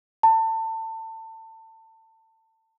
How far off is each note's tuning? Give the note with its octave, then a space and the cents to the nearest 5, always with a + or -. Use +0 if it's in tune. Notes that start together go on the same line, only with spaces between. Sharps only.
A5 +30